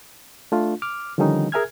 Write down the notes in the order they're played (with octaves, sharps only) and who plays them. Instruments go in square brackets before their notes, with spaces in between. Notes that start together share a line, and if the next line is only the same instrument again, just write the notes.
[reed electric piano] A3 D4 F4
D6 F6
D3 D#3 F3 G3 C#4 D#4
G#4 A#4 E5 G#5 F6 G#6